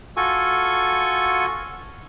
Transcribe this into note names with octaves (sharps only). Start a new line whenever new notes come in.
F4 F#4 A4 G#5 C#6